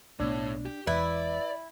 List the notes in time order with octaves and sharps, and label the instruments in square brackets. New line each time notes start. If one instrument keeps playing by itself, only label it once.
[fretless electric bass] B1 A3 B3 [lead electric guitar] A2 [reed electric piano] D4
[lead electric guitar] G4
[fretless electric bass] E1 E2 [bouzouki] E4 [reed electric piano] B4 [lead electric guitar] D5